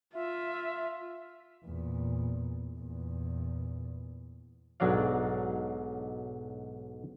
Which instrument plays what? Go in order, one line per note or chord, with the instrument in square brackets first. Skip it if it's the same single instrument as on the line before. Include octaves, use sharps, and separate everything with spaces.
[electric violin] F4 [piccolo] E5
[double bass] E2 A#2
E2 A#2
[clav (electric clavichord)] B1 G#2 F#3 D4 D5 F5